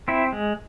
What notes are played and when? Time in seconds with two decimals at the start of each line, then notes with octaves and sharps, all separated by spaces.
0.08 C4 E4
0.33 G#3